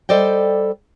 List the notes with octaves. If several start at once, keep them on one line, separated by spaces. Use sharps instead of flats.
G3 A4 C5 D5 D#5 G5